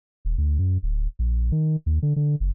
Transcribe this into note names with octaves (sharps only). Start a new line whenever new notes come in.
D#1
D2
F#2
D1
A#1
D#3
D#2
D3
D3
F#1